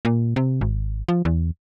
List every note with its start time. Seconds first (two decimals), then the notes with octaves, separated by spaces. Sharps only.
0.05 A#2
0.36 C3
0.61 G#1
1.08 F3
1.25 E2